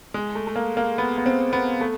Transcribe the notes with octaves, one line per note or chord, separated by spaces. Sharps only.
G#3
A3
A3
A#3
A#3
B3
B3
C4
B3
A3